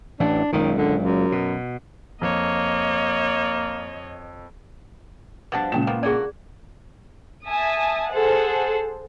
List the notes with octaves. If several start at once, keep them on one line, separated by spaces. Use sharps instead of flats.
A1 A2 E3 D4
F#1 C#2 A#2 D#3
D3
F#2
B2
F2 A#3 C#5 D#5
B2 F3 G3 D4 F#5 A5
C#2 A#2 C#3 G5 E7
F3 A#3 B3
D3 A#3 F#4 G#4 D5
E5 G#5 A5 D#6
G#4 A4 C5 F#5